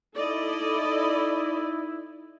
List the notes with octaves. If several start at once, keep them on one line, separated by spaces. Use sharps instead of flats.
D#4 E4 A4 D5 D#5